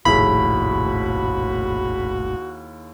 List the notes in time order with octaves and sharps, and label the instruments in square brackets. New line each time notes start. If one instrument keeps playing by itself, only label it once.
[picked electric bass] F1 A#1 A2 [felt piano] D#2 E4 G#4 [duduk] F#4 [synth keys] B5